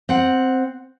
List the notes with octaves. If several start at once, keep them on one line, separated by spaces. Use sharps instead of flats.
C4 F#5